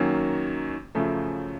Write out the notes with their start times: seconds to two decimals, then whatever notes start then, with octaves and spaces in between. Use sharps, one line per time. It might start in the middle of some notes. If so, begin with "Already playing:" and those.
Already playing: F#2 D#3 F#3 A#3 C#4
0.95 F#2 C#3 F3 A3